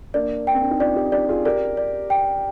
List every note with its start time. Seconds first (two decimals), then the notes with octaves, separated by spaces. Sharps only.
0.14 A#3 D4 D5
0.47 G5
0.54 C4
0.62 D4
0.71 D#4
0.80 D4 F4 D5
0.96 D#4 G4
1.12 D#4 G4 D5
1.29 F4 G#4
1.45 G4 A#4 D5
1.77 D5
2.10 G5